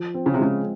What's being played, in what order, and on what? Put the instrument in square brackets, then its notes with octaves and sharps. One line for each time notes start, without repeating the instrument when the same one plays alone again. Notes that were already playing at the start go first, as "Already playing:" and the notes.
Already playing: [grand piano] F3
C4
[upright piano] C#3
C3
[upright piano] C#3 [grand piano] G#3